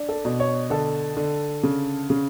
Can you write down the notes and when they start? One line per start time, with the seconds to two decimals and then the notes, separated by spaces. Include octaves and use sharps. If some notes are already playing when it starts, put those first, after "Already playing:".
Already playing: D4
0.09 A4
0.25 B2
0.40 C#5
0.70 D3 A4
1.17 D3
1.63 C#3
2.10 C#3